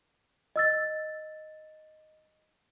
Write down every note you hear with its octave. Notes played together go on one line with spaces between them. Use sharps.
D#5 E6 A6